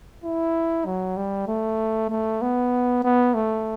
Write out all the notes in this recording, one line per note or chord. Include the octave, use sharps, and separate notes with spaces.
E4
F#3
G3
A3
A3
B3
B3
A3